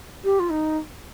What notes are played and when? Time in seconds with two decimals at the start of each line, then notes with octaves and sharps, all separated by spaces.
0.24 G4
0.39 F4
0.49 D#4